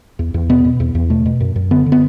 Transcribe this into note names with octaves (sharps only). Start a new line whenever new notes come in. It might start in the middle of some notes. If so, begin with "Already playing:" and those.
E2
E2
B2 B3
B2
E2
E2
B2 A3
B2
F#2
F#2
D3 B3
D3
B3